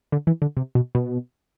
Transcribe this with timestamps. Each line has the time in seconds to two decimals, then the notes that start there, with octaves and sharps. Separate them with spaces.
0.12 D3
0.27 E3
0.42 D3
0.57 C3
0.75 B2
0.95 B2